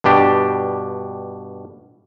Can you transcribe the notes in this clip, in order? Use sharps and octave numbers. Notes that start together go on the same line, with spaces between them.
G2 B2 D4 G4